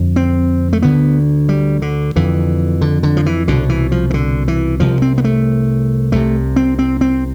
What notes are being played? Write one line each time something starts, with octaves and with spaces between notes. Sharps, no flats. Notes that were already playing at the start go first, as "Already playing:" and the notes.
Already playing: F2 D3
C4
A3
D2 D3 B3
G3
D3
F2 D3 E3
D3
D3
F3
E3
C2 B2 D3
E3
F3
E3
D3
E3
C2 C3 F3
C4
B3
A3
C2 C3 A3
C4
C4
C4